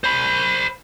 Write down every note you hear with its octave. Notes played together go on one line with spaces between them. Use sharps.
C5 B5